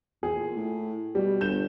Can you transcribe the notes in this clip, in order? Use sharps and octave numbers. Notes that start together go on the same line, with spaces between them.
E2 G#4
A#2
A2
B2 G3
G1 G6 E7